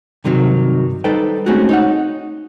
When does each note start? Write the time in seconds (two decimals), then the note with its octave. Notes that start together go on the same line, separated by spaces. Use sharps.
0.24 G2 C3 D#3 F#3
1.04 G3 D#4 A4 B4 C5 G5
1.46 G#3 A3 C4 C#4 D#4 F#4
1.69 D#4 C#5 F#5